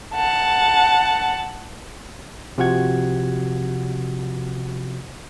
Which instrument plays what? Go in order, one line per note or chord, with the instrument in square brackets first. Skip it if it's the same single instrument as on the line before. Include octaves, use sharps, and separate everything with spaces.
[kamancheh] F#5 A5
[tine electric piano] C3 F3 F#4 F#5 G#6